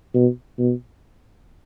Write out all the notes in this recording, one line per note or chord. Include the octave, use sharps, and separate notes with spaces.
B2
B2